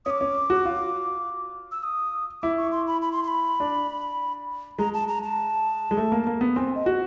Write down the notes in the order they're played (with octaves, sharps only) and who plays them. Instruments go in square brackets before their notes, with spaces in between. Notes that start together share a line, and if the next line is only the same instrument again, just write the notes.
[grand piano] C#4 [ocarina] D6 D#6
[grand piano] C#4
F#4
F4
[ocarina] E6
D#6
[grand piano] E4 [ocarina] D6
[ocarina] C#6
C6
B5
B5
C6
C6
B5
[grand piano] D4
[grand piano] G#3 [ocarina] A#5
[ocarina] A5
A#5
A5
[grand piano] G#3
A3
A#3
A#3
B3
[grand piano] C4 [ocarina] G#5
[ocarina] D#5
[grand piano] F#4